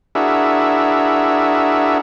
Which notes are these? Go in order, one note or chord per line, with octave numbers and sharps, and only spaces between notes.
D4 E4 F#4 G#4 A#4 E5